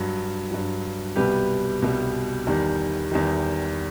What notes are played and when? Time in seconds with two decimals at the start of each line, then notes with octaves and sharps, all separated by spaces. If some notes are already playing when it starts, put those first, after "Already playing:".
Already playing: G2 F#3
0.51 G2 F#3
1.16 C2 B2 G3 G4 B4
1.82 C2 B2 G3
2.47 E2 D#3 G3
3.12 E2 D#3 G3